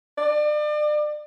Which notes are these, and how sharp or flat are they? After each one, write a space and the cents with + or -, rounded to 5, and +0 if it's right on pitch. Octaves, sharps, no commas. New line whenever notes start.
D5 +35